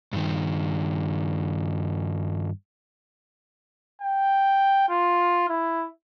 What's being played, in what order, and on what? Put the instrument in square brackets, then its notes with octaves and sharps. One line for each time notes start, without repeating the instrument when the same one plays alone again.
[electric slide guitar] G2 D#3
[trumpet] G5
F4
E4